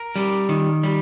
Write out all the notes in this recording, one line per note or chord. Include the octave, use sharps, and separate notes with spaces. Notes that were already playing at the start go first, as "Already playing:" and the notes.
Already playing: A#4
G3
D#3
G3